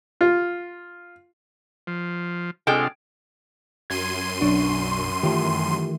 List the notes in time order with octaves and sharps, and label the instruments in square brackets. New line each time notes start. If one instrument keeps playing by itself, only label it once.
[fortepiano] F4
[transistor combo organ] F3
[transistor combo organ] C3 D4 F4 [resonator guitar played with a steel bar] G#3 A4 G5
[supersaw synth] F#2 C6 D#7 [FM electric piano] G#6
[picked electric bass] B1 [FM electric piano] F#3 D4 C#6
[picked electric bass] D#3 E3 A3 [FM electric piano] F4 G4